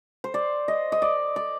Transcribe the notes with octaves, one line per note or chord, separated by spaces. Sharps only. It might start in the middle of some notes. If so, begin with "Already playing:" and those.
C5
D5
D#5
D#5
D5
D5